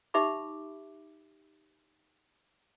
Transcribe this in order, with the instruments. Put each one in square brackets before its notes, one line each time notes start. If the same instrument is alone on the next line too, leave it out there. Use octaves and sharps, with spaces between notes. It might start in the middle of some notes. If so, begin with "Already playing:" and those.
[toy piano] D#4 G4 E5 B5 D6